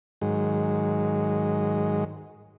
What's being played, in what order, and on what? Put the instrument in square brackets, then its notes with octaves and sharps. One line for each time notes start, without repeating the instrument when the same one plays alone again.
[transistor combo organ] G#2 D#3 F#3 G#3